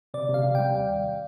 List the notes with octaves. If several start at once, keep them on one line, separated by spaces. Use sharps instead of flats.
C3 D5
C3 F5
C3
G3 G5
D#2 G5
D#2